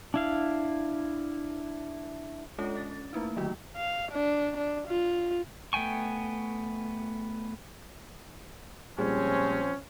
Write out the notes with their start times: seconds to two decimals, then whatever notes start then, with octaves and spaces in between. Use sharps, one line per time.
0.14 D4 E4 F5
2.58 G#3 C#4 D4 F4 A4 C#5
2.75 C#4 A6
3.13 A3 A#3 D#4 E4
3.36 D3 D#3 F#3 A3 D#4 F#4
3.77 F5
4.12 D4
4.58 D4
4.88 F4
5.73 A3 B3 G5 G#5 C#6
8.98 A#2 F3 G3 G#3 C4 C#4